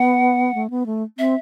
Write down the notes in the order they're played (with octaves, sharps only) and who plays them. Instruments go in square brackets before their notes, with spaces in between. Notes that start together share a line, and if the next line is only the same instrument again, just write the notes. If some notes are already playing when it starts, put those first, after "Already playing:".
Already playing: [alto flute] B3 [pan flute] F#5
[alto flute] A3
B3
A3
[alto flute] C4 [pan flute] E5